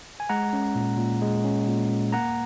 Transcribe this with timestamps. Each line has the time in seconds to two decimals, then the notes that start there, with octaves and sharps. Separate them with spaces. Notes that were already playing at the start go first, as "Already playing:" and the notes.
0.20 G#5
0.30 G#3 F#5 A#5
0.53 C#4
0.75 A#2
0.98 A#2
1.22 G#3
1.45 C#4
1.68 A#2
1.91 A#2
2.12 A#3 F#5 A#5